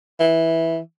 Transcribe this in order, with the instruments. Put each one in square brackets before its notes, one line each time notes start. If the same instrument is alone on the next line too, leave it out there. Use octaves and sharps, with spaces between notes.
[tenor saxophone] E3